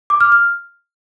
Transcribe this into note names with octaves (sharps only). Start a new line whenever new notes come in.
D6
F6
F6